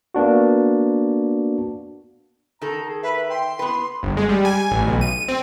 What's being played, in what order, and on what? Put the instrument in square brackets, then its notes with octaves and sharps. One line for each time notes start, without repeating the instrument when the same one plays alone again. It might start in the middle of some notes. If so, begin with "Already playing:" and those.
[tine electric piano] A#3 B3 D4 F#4
[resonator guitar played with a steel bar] D#3 A4 [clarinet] A#5
[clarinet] G#4
[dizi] B4 [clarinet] E5
[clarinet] G5 [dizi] C6
[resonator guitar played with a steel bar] B3 B4 [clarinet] E4
[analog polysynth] G1
G#3
G3
G#5
G#5
A1
B1
D#7
C4